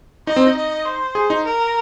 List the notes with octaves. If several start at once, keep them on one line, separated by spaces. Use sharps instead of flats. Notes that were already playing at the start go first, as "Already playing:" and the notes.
D#4 D#5
C4
D#4
D#5
C5
G#4
D#4
A#4